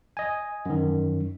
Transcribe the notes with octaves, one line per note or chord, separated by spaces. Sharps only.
D#5 G#5
F#2 D#3